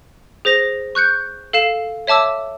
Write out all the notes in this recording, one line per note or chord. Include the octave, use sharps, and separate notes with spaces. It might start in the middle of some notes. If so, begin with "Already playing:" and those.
G#4 C5 A#6 F7
C#6 F#6 G6 C#7
A4 F5 C7 E7
C#5 E5 A5 D6 E6